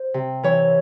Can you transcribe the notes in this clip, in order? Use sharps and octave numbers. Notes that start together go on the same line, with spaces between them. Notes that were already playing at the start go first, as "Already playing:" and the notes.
Already playing: C5
C3
E3 C#5